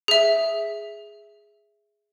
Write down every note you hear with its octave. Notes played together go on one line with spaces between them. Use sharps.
G#4 E5